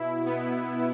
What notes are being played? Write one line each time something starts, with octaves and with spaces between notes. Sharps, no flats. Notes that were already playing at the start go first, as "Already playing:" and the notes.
Already playing: B2 E4
B3